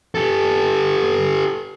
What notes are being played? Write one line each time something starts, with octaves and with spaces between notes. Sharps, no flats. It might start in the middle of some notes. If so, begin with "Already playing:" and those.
G4 A4